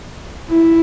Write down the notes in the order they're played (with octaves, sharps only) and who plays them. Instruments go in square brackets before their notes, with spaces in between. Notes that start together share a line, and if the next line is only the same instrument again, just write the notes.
[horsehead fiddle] E4